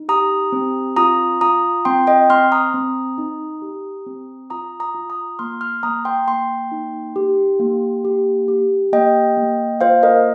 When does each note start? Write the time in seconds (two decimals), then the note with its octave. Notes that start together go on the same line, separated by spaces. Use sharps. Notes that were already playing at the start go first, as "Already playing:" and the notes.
Already playing: D#4
0.09 G4 A#5 D#6
0.52 C4
0.96 F4 A#5 D#6
1.41 F4 A#5 D#6
1.85 C4 G5 C6
2.07 D#5 G5
2.30 C4 C6 F6
2.52 A#5 D#6
2.74 C4
3.18 D#4
3.62 G4
4.06 C4
4.50 F4 A#5 D#6
4.80 A#5 D#6
4.94 F4
5.10 A#5 D#6
5.39 A#3 C6 F6
5.61 C6 F6
5.83 A#3 A#5 D#6
6.05 G5 C6
6.27 A#3 G5 C6
6.72 D#4
7.16 G4
7.60 A#3
8.05 G4
8.48 G4
8.93 A#3 D#5 G5
9.37 A#3
9.81 F4 C5 F5
10.03 A#4 D#5